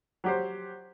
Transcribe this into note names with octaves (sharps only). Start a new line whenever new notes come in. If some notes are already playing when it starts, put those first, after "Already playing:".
F#3 G4 C5